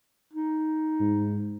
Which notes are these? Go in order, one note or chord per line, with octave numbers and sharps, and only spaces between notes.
D#4
G#2